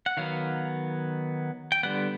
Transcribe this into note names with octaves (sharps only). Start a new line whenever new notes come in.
F#5
D#3 F#3 B3 F5
G5
D3 G3 B3 F#5